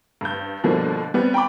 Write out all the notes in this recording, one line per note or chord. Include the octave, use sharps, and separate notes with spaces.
G2 G6
B2 D3 F3 G3 A#3
G3 B3 C4
G5 A#5 B5 D6